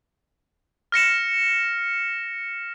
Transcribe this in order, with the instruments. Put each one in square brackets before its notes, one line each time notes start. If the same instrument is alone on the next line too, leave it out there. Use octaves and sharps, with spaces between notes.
[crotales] F6 A#6 C#7 E7